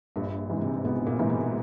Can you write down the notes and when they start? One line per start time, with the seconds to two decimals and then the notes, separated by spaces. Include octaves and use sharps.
0.16 A#1 G2 G3
0.50 G#2 E3
0.61 C3 C4
0.84 A#1 B2 B3
1.06 A#2 A#3
1.19 G#2 E3
1.30 B2 B3